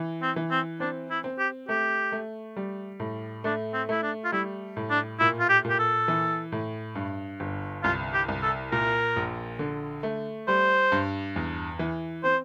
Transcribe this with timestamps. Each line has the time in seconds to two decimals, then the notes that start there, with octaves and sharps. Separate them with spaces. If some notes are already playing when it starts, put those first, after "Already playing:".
Already playing: E3
0.22 C4
0.36 E3
0.51 C4
0.80 C4 D4
1.10 E4
1.24 C4
1.39 G4
1.69 A3 G4
2.12 A3
2.57 G3
3.00 A2
3.44 A3 D4
3.74 C4
3.89 A3 E4
4.03 D4
4.25 F4
4.32 G3 E4
4.77 A2
4.90 D4
5.20 A#2 E4
5.40 F4
5.49 G4
5.65 A#2
5.70 G4
5.79 A4
6.08 E3
6.52 A2
6.95 G2
7.40 G1
7.83 C2 F4
8.13 G4
8.28 C2
8.42 A4
8.72 A#2 A#4
9.16 A#1
9.59 D3
10.03 A3
10.48 G3 C5
10.92 G2
11.36 E2
11.79 E3
12.24 C4 C5